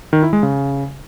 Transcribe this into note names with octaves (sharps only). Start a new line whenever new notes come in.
D#3
E4
G#3
C#3